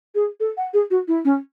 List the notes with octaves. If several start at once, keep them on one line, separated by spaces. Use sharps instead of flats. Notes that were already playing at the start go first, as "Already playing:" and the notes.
G#4
A4
F#5
G#4
F#4
E4
C#4